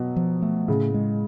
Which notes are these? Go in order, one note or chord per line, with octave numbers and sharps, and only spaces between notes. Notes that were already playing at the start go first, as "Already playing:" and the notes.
Already playing: B2 F#3
F3
A3
A2 C#3
G#3